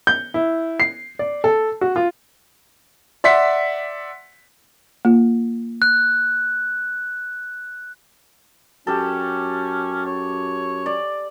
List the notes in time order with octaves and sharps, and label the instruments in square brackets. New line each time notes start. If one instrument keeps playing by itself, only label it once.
[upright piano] G6
E4
C7
D5
A4
F#4
F4
[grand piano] D5 E5 F#5 C6 B6
[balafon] A#3 F4
[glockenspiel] F#6
[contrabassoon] F#2 [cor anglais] C#4 [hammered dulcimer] G4 A4
[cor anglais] C#5
[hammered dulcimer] D5